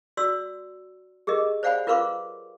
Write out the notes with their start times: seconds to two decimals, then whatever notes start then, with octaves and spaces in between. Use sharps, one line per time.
0.17 F#4 D5 C6 E6
1.27 G4 G#4 A#4 D#5
1.63 C5 D5 F5 F#5 G#5 B5
1.87 F4 A#4 B4 F5 C6 D6